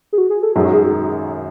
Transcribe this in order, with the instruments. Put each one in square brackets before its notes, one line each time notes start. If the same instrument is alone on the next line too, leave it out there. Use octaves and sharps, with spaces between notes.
[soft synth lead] G#4
F#4
G#4
A4
[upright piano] G#1 F#2 D#3 F#3 [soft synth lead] G#4
[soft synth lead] F#4
G#4